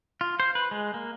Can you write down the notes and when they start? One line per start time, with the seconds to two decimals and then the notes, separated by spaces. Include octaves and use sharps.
0.21 F4
0.40 C5
0.55 B4
0.71 G#3
0.94 A#3